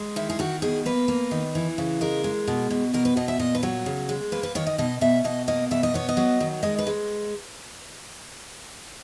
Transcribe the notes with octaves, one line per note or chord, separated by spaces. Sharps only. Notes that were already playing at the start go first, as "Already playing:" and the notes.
Already playing: G#3
D#3 E4
G#4
D#3 F#4
B2 G#4
A#3 B4
A#3
D#3
E3
C#3
G#3 A#4
G#3
B2
B2
B2 A#4
B4
B2 D#5
E5
A#2 D#5
B4
F#3 C#5
C#3
G#3
A#3 B4
B4
D#3 C#5
D#5
B2 D#5
B2 E5
B2 D#5
A#3 D#5
B2 E5
D#5
B3 C#5
D#5
F#3
D#3
G#3 D#5
B4
G#3